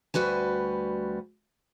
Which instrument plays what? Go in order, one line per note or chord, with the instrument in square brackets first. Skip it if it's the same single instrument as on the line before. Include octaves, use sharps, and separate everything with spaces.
[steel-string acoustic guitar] D2 G3 F#4 B4 G#5